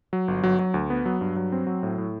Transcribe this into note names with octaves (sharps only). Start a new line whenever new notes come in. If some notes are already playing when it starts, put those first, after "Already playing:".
F#3
G1
F#3
F#3
D2
B3
F#3
G2
F#3
C4
F#3
A2
A2